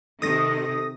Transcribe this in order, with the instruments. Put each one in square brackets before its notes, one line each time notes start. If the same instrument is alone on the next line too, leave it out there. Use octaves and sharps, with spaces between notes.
[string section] C3 D#3 [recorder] A4 [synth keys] D#6 A#6